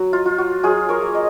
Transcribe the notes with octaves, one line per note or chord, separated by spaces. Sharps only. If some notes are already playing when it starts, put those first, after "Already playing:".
Already playing: F#3
F4
F4
F#4
F#3 F4 G#4
A#4 C#5
A#3
D#5